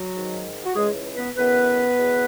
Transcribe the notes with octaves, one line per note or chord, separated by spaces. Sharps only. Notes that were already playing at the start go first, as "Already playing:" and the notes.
Already playing: F#3 F#4
G#2 D#3
F#4
C#2 C#3 E3 G#3 G#4
B3 B4
F#2 C#3 E3 B3 B4
E2 B2